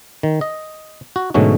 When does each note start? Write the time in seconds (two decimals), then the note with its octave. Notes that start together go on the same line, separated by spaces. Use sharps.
0.23 D#3
0.41 D#5
1.16 F#4
1.34 G#2 B2 D3 F#3 A3 C#4